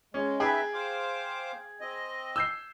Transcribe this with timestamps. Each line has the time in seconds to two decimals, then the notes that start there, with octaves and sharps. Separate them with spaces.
0.14 G#3 C#4
0.40 D#4 G#4 B4 E5 G5
0.74 C5 F5 D6
1.81 C4 D#5
2.36 E6 G6 C7